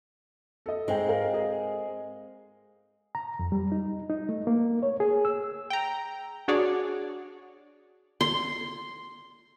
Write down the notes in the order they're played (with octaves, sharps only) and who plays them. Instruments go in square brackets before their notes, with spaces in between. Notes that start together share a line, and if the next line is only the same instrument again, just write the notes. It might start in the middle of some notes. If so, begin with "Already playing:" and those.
[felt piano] A4 D#5
[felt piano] G#2 G5 [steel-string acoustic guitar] G#3 C4
[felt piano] A#4 F5
G#4
[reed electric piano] A#5
F2
G3
D#4
D#4
A3
A#3
C#5
G#4
E6
[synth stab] G5 A#5
D4 F#4 G#4 C#5 D5
[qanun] C6